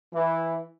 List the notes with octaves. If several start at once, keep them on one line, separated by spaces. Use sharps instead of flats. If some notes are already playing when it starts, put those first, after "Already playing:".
E3